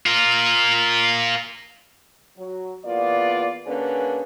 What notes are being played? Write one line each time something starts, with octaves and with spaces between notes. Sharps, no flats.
F4 A#4
F#3
E2 A#3 B3 F4 D5
D3 A#3 C#4 D4 G#4 B4